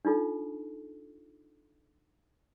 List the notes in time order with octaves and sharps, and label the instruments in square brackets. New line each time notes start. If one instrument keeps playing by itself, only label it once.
[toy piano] D4 D#4 F4 A4